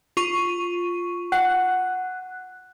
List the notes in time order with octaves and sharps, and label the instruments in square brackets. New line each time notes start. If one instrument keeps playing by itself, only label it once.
[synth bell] F4 C#6 D#7
[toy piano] F#5 [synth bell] F#6